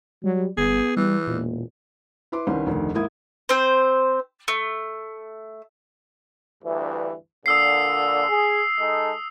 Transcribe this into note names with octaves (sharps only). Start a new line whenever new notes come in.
F#3 G3
G1 B3 G#4
E3 G3
E1 A#2
E4 B4 C6 D6
C2 D#3 C#4 B4 C6
F1 D2 D#3
G#2 A#3 E4 D#6 G#6
C4 C5
A3
D2 G2 E3
A#2 D3 D#6 E6 C7
G#4
G#3 D#4 A4